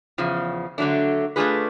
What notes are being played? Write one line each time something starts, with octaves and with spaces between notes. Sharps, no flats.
E2 C#3 F3
D3 F#3 A3 D4
A3 D4 F4 G#4 B4